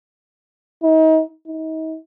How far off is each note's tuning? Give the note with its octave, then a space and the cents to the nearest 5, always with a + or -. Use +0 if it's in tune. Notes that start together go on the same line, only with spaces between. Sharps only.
D#4 +35
D#4 +40